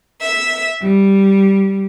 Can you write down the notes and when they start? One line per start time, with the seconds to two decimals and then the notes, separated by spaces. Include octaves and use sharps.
0.21 E5
0.82 G3